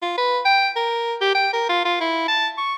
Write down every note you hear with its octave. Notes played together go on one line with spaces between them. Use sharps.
F4
B4
G5
A#4
G4
G5
A#4
F4
F4
E4
A5
C#6